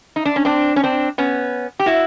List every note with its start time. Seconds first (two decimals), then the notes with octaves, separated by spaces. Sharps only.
0.16 D#4
0.25 D4
0.36 C#4
0.45 C4 D4
0.76 C#4
0.83 C4 D4
1.18 B3 C#4
1.79 G4
1.86 E4 F#4